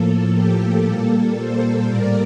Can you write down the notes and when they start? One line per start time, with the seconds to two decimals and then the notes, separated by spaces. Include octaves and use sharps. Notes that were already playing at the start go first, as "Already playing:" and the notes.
Already playing: A2 F3 A#3 A4
0.33 G4
0.84 A#2 G3 A#3 A4
1.38 A4 C5
1.89 A2 G3 A#3 A#4 D5